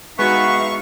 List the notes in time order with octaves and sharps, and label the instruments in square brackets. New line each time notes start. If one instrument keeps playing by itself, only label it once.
[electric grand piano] G#3 F#4 [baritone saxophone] B3 [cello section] D#4 E5 F5 [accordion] C#6